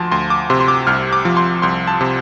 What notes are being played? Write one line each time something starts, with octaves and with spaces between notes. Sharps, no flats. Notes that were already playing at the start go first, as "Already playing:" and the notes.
Already playing: D2 F3 A5 C6
D2 C6
D6
C3 C6
C6
D6
C2 F6
D6
F3
C6
C2 C6
A5
C3